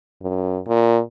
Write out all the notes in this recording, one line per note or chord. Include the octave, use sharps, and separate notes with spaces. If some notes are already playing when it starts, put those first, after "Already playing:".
F#2
A#2